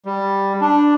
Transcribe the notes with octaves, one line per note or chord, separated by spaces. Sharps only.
G3
D4